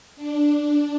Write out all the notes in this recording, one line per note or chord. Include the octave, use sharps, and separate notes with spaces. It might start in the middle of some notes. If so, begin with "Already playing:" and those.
D4